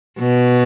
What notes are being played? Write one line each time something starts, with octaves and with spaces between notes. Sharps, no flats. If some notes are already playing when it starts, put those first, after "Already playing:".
B2